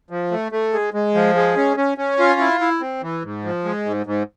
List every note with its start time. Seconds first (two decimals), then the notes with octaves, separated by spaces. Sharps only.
0.10 F3
0.31 A3
0.52 A3
0.73 G#3
0.94 G#3
1.15 F3
1.35 G#3
1.57 C#4
1.77 C#4
1.98 C#4
2.19 F4
2.40 E4
2.61 E4
2.81 C4
3.02 E3
3.23 G#2
3.45 F3
3.65 G#3
3.86 G#2
4.06 G#2